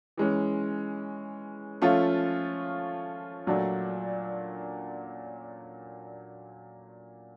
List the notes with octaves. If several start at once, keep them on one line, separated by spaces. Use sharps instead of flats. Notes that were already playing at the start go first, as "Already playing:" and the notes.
E3 G#3 C#4
F3 A3 C#4 F4
A#2 F#3 A3 D4